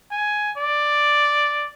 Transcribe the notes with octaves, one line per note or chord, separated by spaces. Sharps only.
G#5
D5